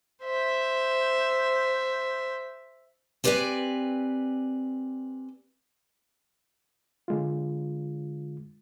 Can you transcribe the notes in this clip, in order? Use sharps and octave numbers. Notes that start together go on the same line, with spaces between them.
C5 E5
C4 G4 B4 C5 D5 G#5
D3 G#3 F4